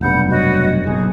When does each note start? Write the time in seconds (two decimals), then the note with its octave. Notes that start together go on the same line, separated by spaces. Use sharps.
0.01 F1 B1 G2 F#5 B5 G6
0.31 F#4 C#5 D#5
0.84 F#1 B1 G#4